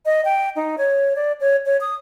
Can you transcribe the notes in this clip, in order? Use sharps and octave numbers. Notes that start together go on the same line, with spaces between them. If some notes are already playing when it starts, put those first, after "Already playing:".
D#5
G5
D#4
C#5
D5
C#5
C#5
D#6